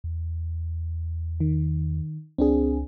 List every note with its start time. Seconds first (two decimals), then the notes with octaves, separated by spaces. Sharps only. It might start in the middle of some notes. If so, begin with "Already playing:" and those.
0.04 E2
1.40 D#3
2.38 C#2 C4 D4 G#4